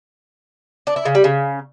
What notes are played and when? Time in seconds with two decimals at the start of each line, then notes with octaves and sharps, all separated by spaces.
0.87 D4
0.96 E4
1.05 C#3
1.15 G3
1.24 C#3